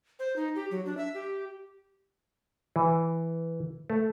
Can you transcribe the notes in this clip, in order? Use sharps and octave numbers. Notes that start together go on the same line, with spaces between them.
C5
D#4
G4
F#3
D4
E5
G4
E3
A3